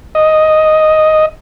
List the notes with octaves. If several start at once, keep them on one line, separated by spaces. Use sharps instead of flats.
D#5